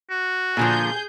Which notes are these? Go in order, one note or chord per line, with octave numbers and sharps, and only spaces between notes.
F#4
A#2 D3 F3 G#4 G6